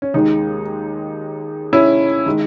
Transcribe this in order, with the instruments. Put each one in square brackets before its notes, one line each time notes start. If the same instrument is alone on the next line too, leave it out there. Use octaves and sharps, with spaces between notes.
[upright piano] C#4
D#2 D#3 G#3 D#4
C#4 E4
D#3 G#3